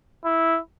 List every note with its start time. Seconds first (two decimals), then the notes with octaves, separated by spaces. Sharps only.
0.25 E4